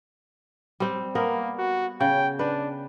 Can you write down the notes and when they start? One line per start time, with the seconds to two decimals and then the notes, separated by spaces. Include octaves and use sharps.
0.80 G3 C4 C5
1.15 A#3 B3 A#4
1.58 F#4
2.00 C#3 G5
2.39 D4 B4